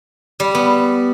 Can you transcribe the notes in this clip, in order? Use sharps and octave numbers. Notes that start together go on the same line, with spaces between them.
G3
B3